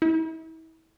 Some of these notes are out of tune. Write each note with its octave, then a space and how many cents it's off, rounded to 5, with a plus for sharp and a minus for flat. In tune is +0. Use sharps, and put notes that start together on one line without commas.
E4 -40